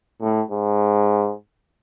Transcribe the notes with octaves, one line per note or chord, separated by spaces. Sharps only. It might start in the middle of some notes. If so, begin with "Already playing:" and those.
A2
G#2